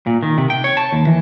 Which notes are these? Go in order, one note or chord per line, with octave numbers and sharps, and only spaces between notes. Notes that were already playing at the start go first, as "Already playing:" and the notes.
A#2
D#3
C3
G5
C#5
A5
D#2
E3